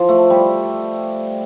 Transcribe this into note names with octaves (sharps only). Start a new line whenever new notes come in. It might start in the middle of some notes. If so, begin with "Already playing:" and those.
Already playing: F3
A3
G3